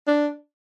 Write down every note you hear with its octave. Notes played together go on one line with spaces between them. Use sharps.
D4